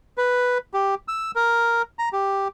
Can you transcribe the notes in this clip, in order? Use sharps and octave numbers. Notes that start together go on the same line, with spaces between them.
B4
G4
E6
A#4
A#5
G4